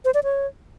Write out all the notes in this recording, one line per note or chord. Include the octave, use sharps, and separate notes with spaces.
C5
D5
C#5